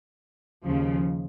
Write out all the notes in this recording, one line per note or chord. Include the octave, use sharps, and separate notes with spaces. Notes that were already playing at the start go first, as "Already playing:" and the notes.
D#2 C#3 F3